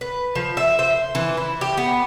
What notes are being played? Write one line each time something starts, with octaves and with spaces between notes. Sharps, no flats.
B4
F3
E5
C5
E3
E4
G4
B3